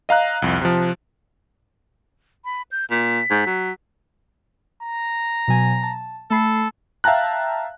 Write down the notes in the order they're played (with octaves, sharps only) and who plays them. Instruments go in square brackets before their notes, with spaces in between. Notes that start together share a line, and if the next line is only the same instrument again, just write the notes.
[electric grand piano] D#5 F5 A#5 F#6
C2 F2
C3 F3
[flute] B5
G6
[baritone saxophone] A#2 [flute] B6
[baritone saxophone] G#2
F#3
[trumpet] A#5
[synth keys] B2 F#3 G#5
A5
[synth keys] A3 B5 C7 [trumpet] A4
[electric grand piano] E5 F5 G5 A5 A#5 F#6